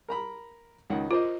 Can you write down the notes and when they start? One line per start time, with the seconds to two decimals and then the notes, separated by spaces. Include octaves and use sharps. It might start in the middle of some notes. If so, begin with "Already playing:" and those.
0.08 A#4 A#5 B5
0.90 C#2 D#3 F#5
1.11 F4 A#4 C5 D#5